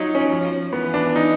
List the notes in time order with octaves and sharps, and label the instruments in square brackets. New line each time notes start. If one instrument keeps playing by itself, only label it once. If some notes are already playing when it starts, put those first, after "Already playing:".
Already playing: [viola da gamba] F#3 [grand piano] D#4 F4
[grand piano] C#4
[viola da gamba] F3
[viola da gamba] E3 [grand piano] B3
[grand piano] D4
D#4